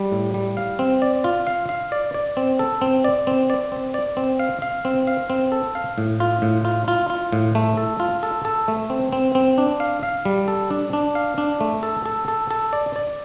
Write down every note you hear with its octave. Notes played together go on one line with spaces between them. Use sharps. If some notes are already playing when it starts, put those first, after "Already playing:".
Already playing: G3
A2
G3
F5
C4
D5
F4
F5
F5
D5
D5
C4
A4
C4
D5
C4
D5
C4
D5
C4
F5
F5
C4
F5
C4
A4
F5
A2
F4
A2
F4
F4
F4
A2
A3
A4
F4
A4
A4
A3
C4
C4
C4
D4
F5
F5
G3
A4
D4
D4
F5
D4
A3
A4
A4
A4
A4
D5
D5